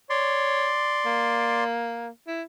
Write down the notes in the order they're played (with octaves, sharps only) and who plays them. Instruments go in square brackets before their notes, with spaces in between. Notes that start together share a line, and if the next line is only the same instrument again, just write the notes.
[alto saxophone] C#5 [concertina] D5 C6
[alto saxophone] A#3
E4